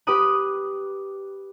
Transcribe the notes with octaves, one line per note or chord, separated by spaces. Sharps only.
G4 B4 D6 D#6 F#6